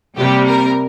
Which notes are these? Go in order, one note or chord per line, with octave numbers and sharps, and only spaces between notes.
C3 G3 A#3 G4
A#4